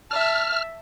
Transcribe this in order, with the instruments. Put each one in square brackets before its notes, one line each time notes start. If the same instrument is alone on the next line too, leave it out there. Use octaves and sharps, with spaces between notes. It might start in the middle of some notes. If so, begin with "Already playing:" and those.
[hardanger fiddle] E5 A5 [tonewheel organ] F6